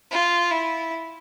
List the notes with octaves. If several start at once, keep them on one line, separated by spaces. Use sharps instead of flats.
F4
E4